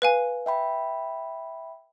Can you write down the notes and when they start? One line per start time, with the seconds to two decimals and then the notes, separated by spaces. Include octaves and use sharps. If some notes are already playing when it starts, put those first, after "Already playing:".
0.02 B4 F5 G#5
0.46 E5 G5 B5